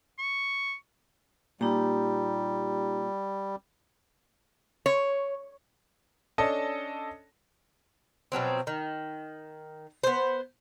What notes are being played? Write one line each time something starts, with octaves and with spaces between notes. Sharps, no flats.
C#6
A#2 G3 D#4 G4 A#5
C#5
C#4 D4 A4 D#5 A5
B2 F3 F#3 C4
D#3
B3 C5